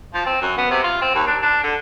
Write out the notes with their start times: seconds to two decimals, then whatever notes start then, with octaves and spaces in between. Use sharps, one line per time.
0.14 F3
0.26 C4
0.41 F#2
0.58 B3
0.70 C3
0.84 F4
1.01 C4
1.15 D#2
1.27 D4
1.43 D4
1.64 D3